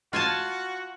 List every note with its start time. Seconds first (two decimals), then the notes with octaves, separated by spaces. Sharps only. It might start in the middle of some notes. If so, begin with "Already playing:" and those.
0.13 F4 F#4 G#5 A5